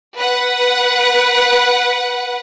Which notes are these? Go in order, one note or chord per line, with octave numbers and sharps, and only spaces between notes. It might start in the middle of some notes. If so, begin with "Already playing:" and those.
B4 F#5